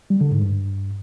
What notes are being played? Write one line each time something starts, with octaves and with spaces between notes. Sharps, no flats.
G3
D3
G#2
G2